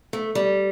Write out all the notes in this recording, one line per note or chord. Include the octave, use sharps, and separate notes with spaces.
A3
G3